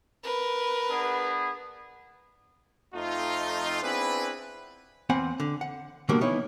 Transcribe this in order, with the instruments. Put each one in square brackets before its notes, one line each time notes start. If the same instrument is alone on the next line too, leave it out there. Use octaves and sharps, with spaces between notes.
[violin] A#4 B4
[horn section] B3 D4 G#4
[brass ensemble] F2 A3 D#4 F4
B3 C4 D4 E4 G#4 B4
[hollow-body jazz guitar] E2 C4 F#5 G#5 B5
D3
F#5
B2 D3 D#3 G3 G#3 A#3
E3 B3 D#4 E4 C#5